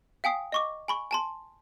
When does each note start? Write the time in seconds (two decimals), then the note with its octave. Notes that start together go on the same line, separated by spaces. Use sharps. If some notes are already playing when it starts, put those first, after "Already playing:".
0.24 F5 G5 G#5 D#6 C7
0.52 D#5 C#6 D6
0.88 G#5 B5 C#6
1.11 G#5 A5 C6